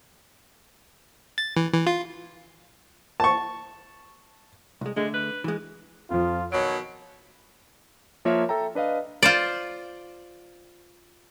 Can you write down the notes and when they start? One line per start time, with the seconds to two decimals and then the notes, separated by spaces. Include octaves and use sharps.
1.38 A6
1.56 E3
1.74 E3
1.87 F4
3.20 A5 C#6
4.81 C2 G#3
4.96 D3 G#3 A3
5.14 B4
5.44 E3 G#3
6.10 F2 F3 F4
6.52 B2 D#3 F#3 C#5 D7
8.25 F3 A#3 F4 A#4 C#5 E5
8.49 A4 E5 G5 A#5
8.75 D4 B4 D#5 F5
9.23 F4 C5 D5